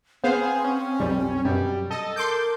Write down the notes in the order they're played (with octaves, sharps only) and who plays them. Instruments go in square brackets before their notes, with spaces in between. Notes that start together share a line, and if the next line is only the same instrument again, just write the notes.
[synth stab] B3 C5 F5 [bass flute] C4 [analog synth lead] G#4
[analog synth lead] C#4
[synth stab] B1 F2 G3
[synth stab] F#2 B2 [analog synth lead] G3
[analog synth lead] A4 [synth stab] D#5
[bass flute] A#4 [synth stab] C6 D6 G6